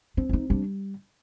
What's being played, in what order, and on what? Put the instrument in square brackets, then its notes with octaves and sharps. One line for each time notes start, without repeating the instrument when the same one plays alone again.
[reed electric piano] C4 [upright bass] D4
[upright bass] E4
D#4
[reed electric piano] G3 [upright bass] D4